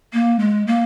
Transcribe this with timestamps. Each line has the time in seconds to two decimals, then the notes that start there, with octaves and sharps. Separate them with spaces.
0.13 A#3
0.39 G#3
0.67 A#3